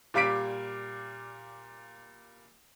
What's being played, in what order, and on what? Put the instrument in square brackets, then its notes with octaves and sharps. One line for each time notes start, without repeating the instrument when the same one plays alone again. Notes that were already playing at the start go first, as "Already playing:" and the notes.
[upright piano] A#2 G3 F5 D6 B6 D7